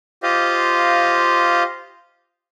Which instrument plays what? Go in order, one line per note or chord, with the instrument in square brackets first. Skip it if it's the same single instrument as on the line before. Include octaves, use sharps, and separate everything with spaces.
[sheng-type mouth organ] F4 G4 C5 D#5 F5